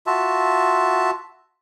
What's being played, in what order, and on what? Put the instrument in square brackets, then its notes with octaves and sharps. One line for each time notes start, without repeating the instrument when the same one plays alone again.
[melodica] F4 F#4 E5 A5